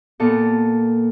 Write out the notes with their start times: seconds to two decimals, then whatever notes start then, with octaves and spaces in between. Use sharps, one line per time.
0.20 A#2 B3 A4